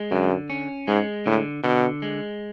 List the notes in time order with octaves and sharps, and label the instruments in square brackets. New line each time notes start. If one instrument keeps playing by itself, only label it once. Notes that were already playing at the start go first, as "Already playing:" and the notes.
Already playing: [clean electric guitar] G#3
[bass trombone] F#2 [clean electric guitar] D3
[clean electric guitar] C#4
[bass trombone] G#2 [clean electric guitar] G#3
[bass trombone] A2 [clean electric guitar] D3
[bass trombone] B2 [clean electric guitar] D3
[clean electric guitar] G#3